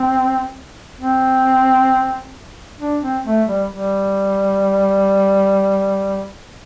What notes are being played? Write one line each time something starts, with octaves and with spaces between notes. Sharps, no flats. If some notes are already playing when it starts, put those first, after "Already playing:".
Already playing: C4
C4
D4
C4
A3
G3
G3